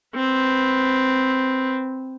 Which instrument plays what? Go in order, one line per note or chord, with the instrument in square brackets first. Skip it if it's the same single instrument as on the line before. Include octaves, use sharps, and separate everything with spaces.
[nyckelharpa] C4 B4